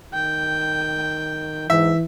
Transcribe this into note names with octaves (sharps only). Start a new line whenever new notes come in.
D#3 G5
G#2 E3 E5